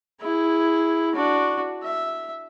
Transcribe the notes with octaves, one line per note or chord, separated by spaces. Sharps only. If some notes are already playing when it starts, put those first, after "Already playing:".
E4 G#4
D4 F#4
E5